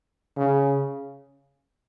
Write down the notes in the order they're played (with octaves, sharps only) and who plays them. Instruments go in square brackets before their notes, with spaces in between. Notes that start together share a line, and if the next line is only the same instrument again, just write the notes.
[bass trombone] C#3